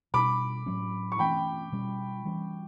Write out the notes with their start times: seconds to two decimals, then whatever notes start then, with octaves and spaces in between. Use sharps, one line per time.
0.14 B2 G3 D4 B5 D6
0.66 A2 F#3 C#4
1.12 C#6
1.19 E3 A3 C#4 G5 B5
1.72 B2 G3 C#4
2.25 E3 G3 C#4